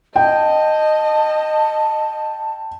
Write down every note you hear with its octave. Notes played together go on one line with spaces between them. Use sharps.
D#5 G5 A5